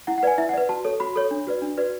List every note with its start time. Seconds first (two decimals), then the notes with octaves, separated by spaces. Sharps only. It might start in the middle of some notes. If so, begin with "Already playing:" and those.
0.07 E4 F#5
0.18 F#5
0.23 B4 D5 G#5
0.38 E4 E5
0.49 F#5
0.54 B4 D5
0.69 F#4 A5
0.84 A4 C#5
1.00 F#4 B5
1.16 A4 C#5
1.31 D4
1.47 F#4 B4 D5
1.62 D4
1.78 F#4 B4 D5